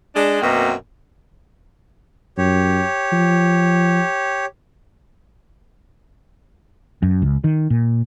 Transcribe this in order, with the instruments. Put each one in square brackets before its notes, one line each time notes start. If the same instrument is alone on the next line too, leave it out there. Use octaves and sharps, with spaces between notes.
[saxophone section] G#3 D4
F#2 B2 A#3 C4
[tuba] F#2 [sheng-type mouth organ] G4 C#5
[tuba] F3
[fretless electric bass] F#2
C#2
D#3
A#2